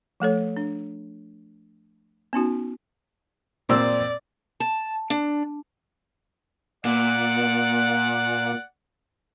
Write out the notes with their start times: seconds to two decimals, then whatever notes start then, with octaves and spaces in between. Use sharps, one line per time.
0.20 F3 A3 A4 C#5
0.57 D4
2.33 B3 C#4 D#4 F#4
3.69 A#2 C4 D5 E6
4.60 A5
5.10 D4
6.85 A#2 D5 F#5